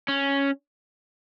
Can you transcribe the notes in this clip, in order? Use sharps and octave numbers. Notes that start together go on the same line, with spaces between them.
C#4